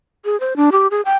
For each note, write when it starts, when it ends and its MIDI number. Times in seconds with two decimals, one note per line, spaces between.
0.25 0.39 68
0.40 0.56 72
0.56 0.70 62
0.72 0.87 67
0.91 1.01 68
1.05 1.16 79